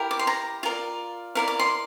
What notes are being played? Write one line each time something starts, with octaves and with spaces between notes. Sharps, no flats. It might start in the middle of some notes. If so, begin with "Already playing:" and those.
Already playing: E4 G4 A#4
D6
C6
A#5
F4 A#4 D5
E4 A#4 D5 F5
D6
C6